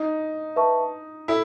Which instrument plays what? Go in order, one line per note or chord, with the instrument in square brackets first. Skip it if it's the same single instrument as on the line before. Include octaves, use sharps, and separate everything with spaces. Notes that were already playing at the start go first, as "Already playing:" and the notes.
Already playing: [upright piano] D#4
[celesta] B4 E5 A5 C#6
[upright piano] E4 [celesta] A4